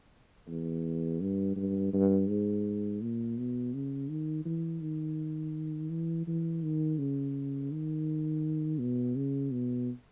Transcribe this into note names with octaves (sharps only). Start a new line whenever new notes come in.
E2
G2
G2
G2
G#2
A#2
B2
C#3
D#3
E3
D#3
E3
E3
D#3
C#3
D#3
B2
C#3
B2